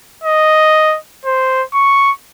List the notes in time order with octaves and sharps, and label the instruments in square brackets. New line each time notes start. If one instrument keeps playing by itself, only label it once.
[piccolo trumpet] D#5
C5
C#6